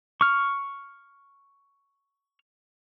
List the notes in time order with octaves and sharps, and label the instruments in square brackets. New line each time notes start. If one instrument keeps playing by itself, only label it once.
[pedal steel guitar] C#6 F6